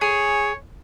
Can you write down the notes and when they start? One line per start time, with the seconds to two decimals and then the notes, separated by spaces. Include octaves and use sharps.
0.01 G#4 C#5